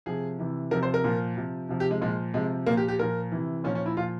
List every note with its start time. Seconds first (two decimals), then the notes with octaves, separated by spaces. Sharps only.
0.06 C3 F3 G#4
0.39 C3 E3
0.71 C3 F3 A#4
0.83 C5
0.94 A#4
1.04 A#2 F3
1.37 C3 F3
1.69 C3 F3
1.80 G4
1.91 G#3
2.01 A#2 F3 G#3
2.34 C3 F3 G#3
2.66 A#2 F3 A#3
2.77 G4
2.88 G4
2.99 A#2 F3 A#4
3.32 C3 E3
3.64 A#2 F3 C#4
3.75 C#4
3.86 E4
3.97 A#2 F3 F4